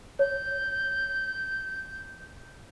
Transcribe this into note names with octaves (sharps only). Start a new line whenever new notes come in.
C#5 G6